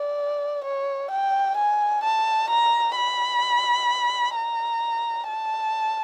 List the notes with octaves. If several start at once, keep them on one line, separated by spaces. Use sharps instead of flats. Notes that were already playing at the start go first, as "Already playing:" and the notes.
Already playing: D5
C#5
G5
G#5
A5
A#5
B5
A#5
A5